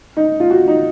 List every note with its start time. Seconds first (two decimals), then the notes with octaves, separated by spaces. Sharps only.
0.17 D#4
0.40 F4
0.50 F#4
0.68 D#4